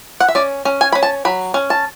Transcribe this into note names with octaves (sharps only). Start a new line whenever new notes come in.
F#5
E5
C#4 D5
C#4
G#5
C#4 B5
A5
F#3 B5
C#4
A5